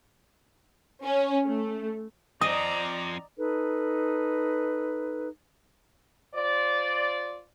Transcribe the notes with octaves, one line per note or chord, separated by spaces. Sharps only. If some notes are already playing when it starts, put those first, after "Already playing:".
C#4
A3
F3 C4 D5 D#5 A#5 D#6
D#4 A4 B4
F4 C5 D5